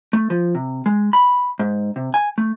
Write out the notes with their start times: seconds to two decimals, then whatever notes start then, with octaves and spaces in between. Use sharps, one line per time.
0.13 A3
0.30 F3
0.55 C3
0.86 G#3
1.13 B5
1.59 G#2
1.96 C3
2.14 G#5
2.38 A3